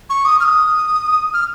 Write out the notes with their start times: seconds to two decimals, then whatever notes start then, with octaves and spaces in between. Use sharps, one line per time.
0.10 C#6
0.25 D#6
0.40 F6
0.45 D#6
1.33 F6